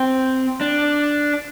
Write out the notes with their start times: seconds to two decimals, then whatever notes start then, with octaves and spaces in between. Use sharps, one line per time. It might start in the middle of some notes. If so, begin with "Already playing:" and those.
Already playing: C4
0.61 D4